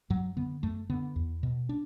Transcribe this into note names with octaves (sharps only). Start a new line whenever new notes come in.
F#2 F#3
D3 B3
F#2 A3
D3 B3
E2
B2
D4